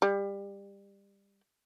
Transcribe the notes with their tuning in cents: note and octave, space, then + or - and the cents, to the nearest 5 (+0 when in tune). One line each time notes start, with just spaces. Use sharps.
G3 +25